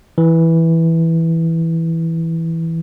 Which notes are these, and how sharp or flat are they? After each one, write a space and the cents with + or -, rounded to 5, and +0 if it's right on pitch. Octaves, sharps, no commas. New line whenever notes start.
E3 -5